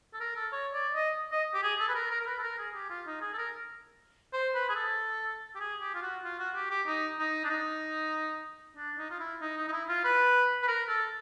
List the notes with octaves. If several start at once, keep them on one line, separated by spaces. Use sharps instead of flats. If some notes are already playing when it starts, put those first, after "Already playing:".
A4
A#4
A4
C#5
D5
D#5
D#5
G4
G#4
A4
B4
A#4
A#4
A#4
B4
A4
A#4
G#4
G4
F4
D#4
G#4
A4
A#4
C5
B4
G#4
A4
G4
G#4
G4
F4
F#4
F4
F#4
G4
G4
D#4
D#4
D4
D#4
D4
D#4
F4
E4
D#4
D#4
D#4
E4
F4
B4
B4
A#4
A4